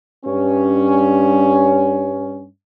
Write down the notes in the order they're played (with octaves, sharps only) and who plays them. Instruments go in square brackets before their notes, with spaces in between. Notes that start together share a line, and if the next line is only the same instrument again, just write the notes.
[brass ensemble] G2 C#4